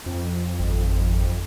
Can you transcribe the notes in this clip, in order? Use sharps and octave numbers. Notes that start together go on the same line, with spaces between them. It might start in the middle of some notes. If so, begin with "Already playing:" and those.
F2
G#1